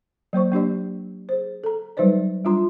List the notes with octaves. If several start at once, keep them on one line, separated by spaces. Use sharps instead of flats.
F#3 A#3 C5 C#6
A#3 D4 G4 D5
G#4 C5
A4 A#5
F#3 G3 D#4 B4 C5 D5
G3 D4 F4 A#5 C6